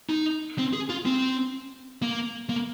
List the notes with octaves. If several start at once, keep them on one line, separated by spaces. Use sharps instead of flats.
D#4
C4
G#4
F4
C4
A#3
A#3